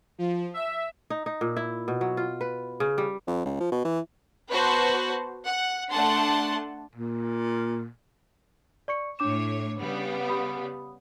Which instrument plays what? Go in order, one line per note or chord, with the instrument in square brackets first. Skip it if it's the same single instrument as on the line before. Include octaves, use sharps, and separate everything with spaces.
[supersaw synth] F3
E5
[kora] D#4
D#4
A#2
E4
B2
F#3
F4
B4
C#3
G3
[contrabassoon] F2
C#2
F3
B2
E3
[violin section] B3 F#4 B4 C5 A5
F#5
A3 D4 F#5 A5 C6
[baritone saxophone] A#2
[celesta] D5 C#6 C#7
[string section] A2 C#5 [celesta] D4 D6 E7
[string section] C#3 G3 B3
[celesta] G4 B5 D#6